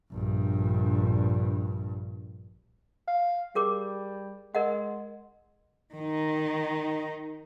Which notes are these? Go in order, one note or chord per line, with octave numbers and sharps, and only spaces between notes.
A#1 G2
F5
G3 G#4 A#4 D6
G#3 A#4 D#5 F#5
D#3 D#4